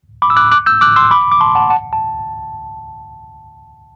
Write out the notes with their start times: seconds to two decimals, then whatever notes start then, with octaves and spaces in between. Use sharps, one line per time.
0.22 B5 D6
0.30 E6
0.37 D6 F#6
0.52 D6 F#6
0.66 E6 G6
0.81 D6 F#6
0.96 C6 E6
1.11 B5 D6
1.32 D6
1.41 A5 C6
1.55 F#5 A5
1.70 F#5 A5
1.93 A5